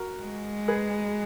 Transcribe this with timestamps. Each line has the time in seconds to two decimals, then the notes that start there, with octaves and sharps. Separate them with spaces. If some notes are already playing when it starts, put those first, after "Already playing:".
Already playing: F#4 A#4
0.23 G#3
0.68 G#4 B4